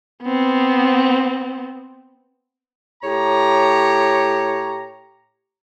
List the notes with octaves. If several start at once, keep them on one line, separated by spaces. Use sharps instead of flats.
B3 C4
A2 G4 C#5 A#5